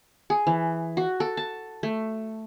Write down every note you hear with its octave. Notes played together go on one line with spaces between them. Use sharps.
G#4
E3
F#4
A4
A5
A3